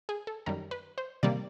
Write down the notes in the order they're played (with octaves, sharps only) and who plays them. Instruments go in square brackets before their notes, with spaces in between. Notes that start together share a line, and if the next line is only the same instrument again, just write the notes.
[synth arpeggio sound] G#4
A4
F#2 D#3 G3 A#4
B4
C5
C3 D#3 G3 A#3 D5